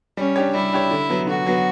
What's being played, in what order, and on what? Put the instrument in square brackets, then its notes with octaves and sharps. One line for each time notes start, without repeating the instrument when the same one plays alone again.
[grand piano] G3 [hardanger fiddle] C#4
[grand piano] D4 G4 C#5
[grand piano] G3 [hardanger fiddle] E4
[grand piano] D4 G4 C#5
D3
F#3 B3
[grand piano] D3 [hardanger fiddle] F#4
[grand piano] F#3 B3